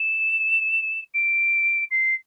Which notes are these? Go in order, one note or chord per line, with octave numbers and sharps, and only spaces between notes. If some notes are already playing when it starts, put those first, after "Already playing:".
Already playing: E7
D7
C7